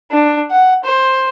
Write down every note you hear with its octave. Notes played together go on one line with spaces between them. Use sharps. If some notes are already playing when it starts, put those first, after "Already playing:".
D4
F#5
C5